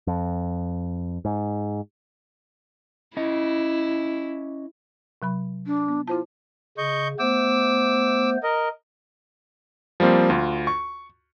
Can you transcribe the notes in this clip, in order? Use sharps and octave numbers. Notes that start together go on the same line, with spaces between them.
F2
G#2
C#4 E4 D#5
C3 F#3 B5
D4
B3
E4 F4 C5 A5
C#3 D#5 C#6 G6
A3 B3 C5 D6 E6
A#4 D#5
F3 G3 A#3 C4
D2 F4
C#6